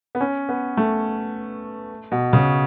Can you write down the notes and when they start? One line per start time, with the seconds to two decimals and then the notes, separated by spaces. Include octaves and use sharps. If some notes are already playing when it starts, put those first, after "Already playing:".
0.15 B3
0.21 C#4
0.49 B3
0.77 A3
2.12 B2
2.33 C#3